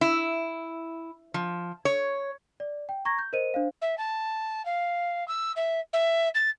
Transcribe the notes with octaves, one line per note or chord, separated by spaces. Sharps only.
E4
F3
C#5
D5
G5
A#5 C#6 G#6 A#6
G6
A#4 C5 D#5 D#7
D4 C5 F5
E5
A5
F5
E6
E5
E5
A6